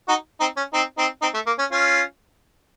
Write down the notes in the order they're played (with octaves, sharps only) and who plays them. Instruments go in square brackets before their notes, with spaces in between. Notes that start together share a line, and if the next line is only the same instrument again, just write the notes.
[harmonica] D#4 F#4
C4 D#4
C#4
C4 D#4
C4 D#4
C4 D#4
A3
A#3
C#4
C#4 F4